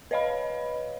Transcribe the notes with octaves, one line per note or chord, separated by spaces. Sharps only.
B4 C#5 D#5 F5 B5